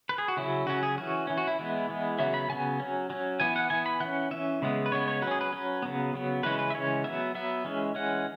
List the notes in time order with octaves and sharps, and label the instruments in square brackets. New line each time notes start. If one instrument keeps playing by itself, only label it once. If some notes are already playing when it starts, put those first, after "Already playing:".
[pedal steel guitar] B4
G#4
F#4
C#3 F#3 C#4 E4
C#3 F#3 C#4 F#4
G#4
E3 C#4 F#4
E3 C#4
F#4
E4
E3 G#3 B3
E3 G#3 B3
C#3 F#3 B3 E5
B5
C#3 F#3 B3 G#5
F#3 C#4
F#3 C#4
E3 B3 G#5
F#5
E3 B3 G#5
B5
E3 C#4 F#5
E3 C#4 E5
C#3 G#3 B3
B4
C#3 G#3 B3 C#5
C#5
F#3 B4
C#4 G#4
B4
F#3 C#4
C#3 F#3 B3
C#3 F#3 B3
C#3 E3 G#3 C#4 B4
B4
E5
C#3 E3 G#3 C#4 C#5
F#3 B3 E5
F#3 B3 E5
E3 G#3 C#4
E3 G#3 C#4 F#5